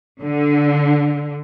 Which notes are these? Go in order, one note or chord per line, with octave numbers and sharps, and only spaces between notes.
D3